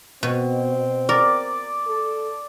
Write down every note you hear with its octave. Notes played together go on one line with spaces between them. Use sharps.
B2 C4
A#4 D5
A4